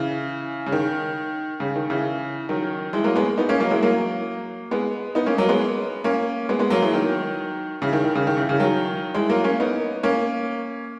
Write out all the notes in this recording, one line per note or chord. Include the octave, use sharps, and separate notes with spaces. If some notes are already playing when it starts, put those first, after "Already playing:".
Already playing: C#3 E3
C#3
D#3
C#3
D#3
C#3 E3
D#3 F#3
E3 G#3
F#3 A#3
G#3 B3
B3 D#4
A#3 C#4
F#3 A#3
E3 G#3
F#3 A#3
G#3 B3
B3 D#4
A#3 C#4
F#3 A#3
G#3 B3
A#3 C#4
G#3 B3
G#3 B3
F#3 A#3
E3 G#3
D#3 F#3
C#3 E3
D#3
D#3
C#3
D#3
C#3 E3
C#3 E3
D#3 F#3
E3 G#3
F#3 A#3
A#3 C#4
B3 D#4
A#3 C#4